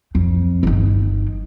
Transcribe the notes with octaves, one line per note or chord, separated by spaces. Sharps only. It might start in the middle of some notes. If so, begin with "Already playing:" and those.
F2
G1 D#3